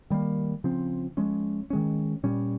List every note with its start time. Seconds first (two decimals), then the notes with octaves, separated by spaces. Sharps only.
0.10 D#3 G3 A#3
0.64 C#3 F3 C4
1.17 F3 G#3 C#4
1.70 D#3 G#3 C#4
2.23 A#2 G3 C#4